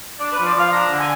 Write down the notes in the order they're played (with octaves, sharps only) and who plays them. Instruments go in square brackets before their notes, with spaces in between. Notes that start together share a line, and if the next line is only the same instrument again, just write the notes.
[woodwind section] D4 D5
B4
F3
D5
F3 F5
D4 A#5
D3
G#5